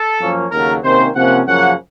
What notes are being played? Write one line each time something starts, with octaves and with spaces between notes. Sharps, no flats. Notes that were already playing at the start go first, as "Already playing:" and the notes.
Already playing: A4
F#2 F3 A#3 C#4
D#2 C#3 F#3 A3 A#4
C3 D#3 A#3 C#4 C5
C3 F3 A#3 C#4 F#5
F#2 C#3 F3 A#3 C#4 F#5